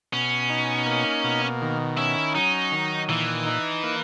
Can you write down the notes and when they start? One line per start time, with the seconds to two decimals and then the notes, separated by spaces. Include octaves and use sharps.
0.12 B2 C#4
0.50 D#4
0.86 A#3
1.24 B2
1.62 D#3
1.97 C#4 E4
2.35 F#3 D#4
2.72 D#3
3.09 A#2 E3
3.46 D#4
3.83 A#3